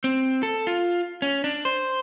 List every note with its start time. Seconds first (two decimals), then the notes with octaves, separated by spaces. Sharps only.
0.04 C4
0.43 A4
0.67 F4
1.22 C#4
1.44 D4
1.65 C5